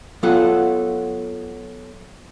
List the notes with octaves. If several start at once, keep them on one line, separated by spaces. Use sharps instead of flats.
F#3 B3 F4 A4 F#5